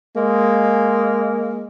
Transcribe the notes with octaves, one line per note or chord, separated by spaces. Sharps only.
G#3 A#3